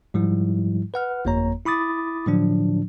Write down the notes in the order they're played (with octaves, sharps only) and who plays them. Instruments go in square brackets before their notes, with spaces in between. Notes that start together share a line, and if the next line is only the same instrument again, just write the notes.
[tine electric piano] G#2 F3 G3 E4
B4 F#5 F6
G1 F2 A#3 C#5 A#5
E4 B5 D6 D#6 A6
A2 D3 F3 F#3 D4